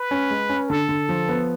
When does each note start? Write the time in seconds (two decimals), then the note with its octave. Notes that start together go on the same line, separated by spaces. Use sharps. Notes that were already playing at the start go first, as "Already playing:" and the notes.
Already playing: B4
0.11 C#4
0.31 G#3
0.49 C#4
0.69 D3 A4
0.89 D3
1.09 F3
1.29 B3